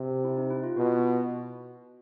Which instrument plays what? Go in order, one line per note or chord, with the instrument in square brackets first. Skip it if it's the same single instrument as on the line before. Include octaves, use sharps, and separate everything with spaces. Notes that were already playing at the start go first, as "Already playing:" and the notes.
Already playing: [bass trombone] C3
[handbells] E4
D#4
E4
F4
[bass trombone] B2 [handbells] F#4